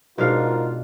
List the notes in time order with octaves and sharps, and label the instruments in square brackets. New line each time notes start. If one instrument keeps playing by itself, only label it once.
[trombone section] G#2 F4 [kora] B2 D4 F5 [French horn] A#4